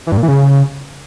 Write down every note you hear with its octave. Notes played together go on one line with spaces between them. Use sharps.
E3
G2
A#2
E3
C#3